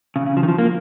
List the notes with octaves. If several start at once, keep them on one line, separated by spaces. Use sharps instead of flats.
C#3
C#3
F3
D#3
F3
A#3